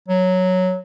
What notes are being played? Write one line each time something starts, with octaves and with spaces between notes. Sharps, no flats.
F#3